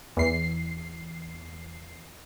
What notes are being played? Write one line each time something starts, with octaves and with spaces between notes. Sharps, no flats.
E2 C7